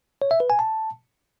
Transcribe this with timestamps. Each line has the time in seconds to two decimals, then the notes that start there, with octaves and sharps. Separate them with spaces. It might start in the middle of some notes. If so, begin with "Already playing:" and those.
0.22 C#5
0.31 E5
0.40 B4
0.50 G#5
0.59 A5